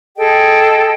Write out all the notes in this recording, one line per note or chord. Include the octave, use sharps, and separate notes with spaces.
G#4 A4 D#5 G5